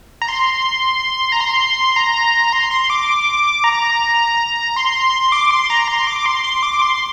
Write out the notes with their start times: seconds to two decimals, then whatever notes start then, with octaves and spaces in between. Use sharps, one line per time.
0.22 A#5
0.28 C6
1.32 A#5
1.41 C6
1.96 A#5
2.53 C6
2.71 C6
2.90 D6
3.64 A#5
4.76 C6
5.32 D6
5.51 C6
5.70 A#5
5.88 C6
6.07 D6
6.26 C6
6.44 C6
6.63 D6
6.82 C6